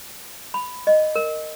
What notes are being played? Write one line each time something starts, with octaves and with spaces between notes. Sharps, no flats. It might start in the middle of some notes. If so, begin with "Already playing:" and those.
B5
D#5
A#4